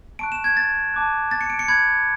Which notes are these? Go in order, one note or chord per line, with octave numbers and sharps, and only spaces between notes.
A5 C#6 F#6 D7
E7
G#6
A6
A5 D6 F#6
A6
C#7
D7
C#7
B5 F#6 G#6